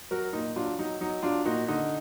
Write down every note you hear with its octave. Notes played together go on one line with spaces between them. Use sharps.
F#3 F#4 A#4
A#2 D#4
F#3 D4 F4
F#3 D#4
F#3 D#4
F#3 D4 F4
A#2 D#4 F#4
D3 D#4